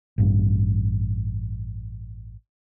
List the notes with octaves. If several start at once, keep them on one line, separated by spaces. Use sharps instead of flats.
A1 G2